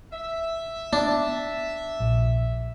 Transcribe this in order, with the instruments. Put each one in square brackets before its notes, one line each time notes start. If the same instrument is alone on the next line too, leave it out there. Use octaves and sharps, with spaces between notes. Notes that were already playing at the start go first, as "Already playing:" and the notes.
[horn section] E5
[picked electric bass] B3 [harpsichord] D4
[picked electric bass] A#1